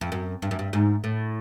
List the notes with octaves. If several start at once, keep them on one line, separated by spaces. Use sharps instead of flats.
F2
F#2
G2
F#2
G2
G#2
A2